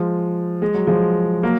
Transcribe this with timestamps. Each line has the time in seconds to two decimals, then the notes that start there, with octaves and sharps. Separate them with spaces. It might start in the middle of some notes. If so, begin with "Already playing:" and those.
Already playing: F3 G#3
0.62 G#3
0.74 F#3
0.87 F3 G#3
1.43 F#3 A#3